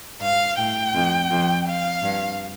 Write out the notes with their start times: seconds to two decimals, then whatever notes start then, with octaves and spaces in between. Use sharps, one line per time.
0.21 G2 F5
0.58 A2 G5
0.94 F2
1.31 F2
1.67 F5
2.03 G2